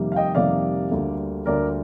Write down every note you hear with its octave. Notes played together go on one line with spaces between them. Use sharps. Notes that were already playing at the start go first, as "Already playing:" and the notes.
Already playing: F2 C3 D#3 G3 A#3
F5
D#5 G5
F2 C3 D#3 G3 A#3 D5 F5
D2 D3 G3 A#3
D2 D3 G3 A#3 A#4 D5